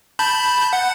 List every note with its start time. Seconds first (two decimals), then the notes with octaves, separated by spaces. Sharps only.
0.19 A5 B5 G6
0.73 F#5